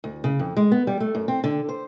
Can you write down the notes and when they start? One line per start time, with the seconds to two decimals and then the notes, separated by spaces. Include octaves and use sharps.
0.04 D2
0.24 C#3
0.39 F2
0.57 G#3
0.72 B3
0.87 G3
1.00 A3
1.15 F#2
1.28 C4
1.44 D3
1.69 C5